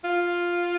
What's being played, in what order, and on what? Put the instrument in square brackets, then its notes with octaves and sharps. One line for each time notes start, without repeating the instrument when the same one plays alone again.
[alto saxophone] F4